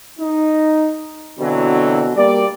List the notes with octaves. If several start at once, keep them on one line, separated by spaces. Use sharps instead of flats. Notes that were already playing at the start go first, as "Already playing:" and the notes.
D#4
B2 D3 E3 F#3 C4
G3 A#3 D5